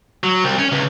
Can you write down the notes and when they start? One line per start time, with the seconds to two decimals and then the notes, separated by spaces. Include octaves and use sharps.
0.24 F#3
0.44 C2
0.59 C#4
0.72 C#2